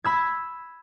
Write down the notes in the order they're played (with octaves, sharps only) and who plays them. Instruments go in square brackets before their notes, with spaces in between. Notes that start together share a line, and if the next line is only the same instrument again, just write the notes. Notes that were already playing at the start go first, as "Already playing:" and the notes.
[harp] B5 E6 G#6